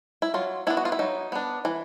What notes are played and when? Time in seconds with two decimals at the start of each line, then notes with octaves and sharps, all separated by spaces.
0.22 E4
0.34 F#3 F4
0.67 B3 D4 E4
0.77 F#4
0.85 F4
0.92 E4
0.99 F#3 D#4
1.32 B3 D4
1.65 E3